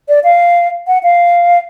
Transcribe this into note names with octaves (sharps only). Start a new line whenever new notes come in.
D5
F5
F#5
F5